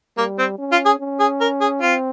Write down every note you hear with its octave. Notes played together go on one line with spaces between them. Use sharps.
G3 A#3
C4
C#4
F4
G#4
C#4
G#4
A#4
G#4
C4 F4